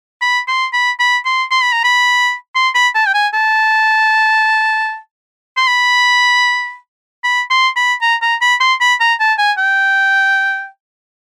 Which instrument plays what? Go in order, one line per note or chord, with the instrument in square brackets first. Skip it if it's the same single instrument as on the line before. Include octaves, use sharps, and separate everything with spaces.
[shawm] B5
C6
B5
B5
C6
C6
B5
A#5
B5
C6
B5
A5
G5
G#5
A5
C6
B5
B5
C6
B5
A#5
A#5
B5
C6
B5
A#5
A5
G#5
G5